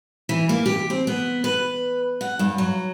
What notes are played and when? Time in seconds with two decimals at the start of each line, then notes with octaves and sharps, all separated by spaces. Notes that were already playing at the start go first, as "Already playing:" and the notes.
0.29 E3
0.49 A#3
0.66 G4
0.90 C4
1.07 B3
1.44 B4
2.21 F#5
2.39 G2
2.58 F#3